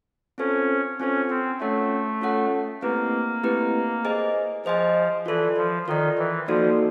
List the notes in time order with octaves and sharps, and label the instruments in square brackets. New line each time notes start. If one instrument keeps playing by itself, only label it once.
[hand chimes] C4 F4 A4 C5 [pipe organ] C#4
[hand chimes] C4 F4 A4 C5 [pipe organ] C#4
[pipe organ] C4
[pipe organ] A3 [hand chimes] C#4 F4 A4 C#5 F#5
[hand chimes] C#4 F4 A4 C#5 F#5
[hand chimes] A3 C4 E4 G4 B4 [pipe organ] A#3
[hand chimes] A3 C4 E4 G4 B4
G#4 C5 D#5 G#5
[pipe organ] F3 [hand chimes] G#4 C5 D#5 G#5
[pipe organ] E3 [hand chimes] F4 A4 D5
[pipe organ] F3
[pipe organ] D#3 [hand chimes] F4 A4 D5
[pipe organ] E3
[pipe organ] F3 [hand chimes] A#3 D#4 F#4 A4 D5